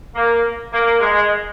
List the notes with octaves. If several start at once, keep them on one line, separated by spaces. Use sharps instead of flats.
A#3
A#3
G#3